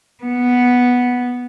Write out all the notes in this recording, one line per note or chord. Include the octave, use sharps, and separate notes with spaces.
B3